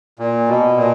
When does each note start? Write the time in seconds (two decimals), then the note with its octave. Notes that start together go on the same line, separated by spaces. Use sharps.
0.19 A#2
0.48 B2
0.77 A#2